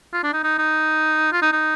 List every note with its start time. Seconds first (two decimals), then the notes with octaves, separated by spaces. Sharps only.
0.13 F4
0.23 D4
0.33 D#4
0.43 D#4
0.58 D#4
1.32 F4
1.42 D#4
1.52 D#4